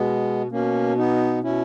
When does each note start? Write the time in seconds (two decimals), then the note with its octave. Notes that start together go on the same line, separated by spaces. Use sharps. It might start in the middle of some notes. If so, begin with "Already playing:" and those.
Already playing: B2 G#3 B3
0.51 B2 A#3 C#4
0.97 B3 D#4
1.43 B2 C#4 E4